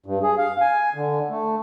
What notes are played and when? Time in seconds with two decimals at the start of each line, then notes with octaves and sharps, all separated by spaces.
0.06 G2
0.23 G#4
0.38 F5
0.61 G#5
0.95 D3
1.30 A3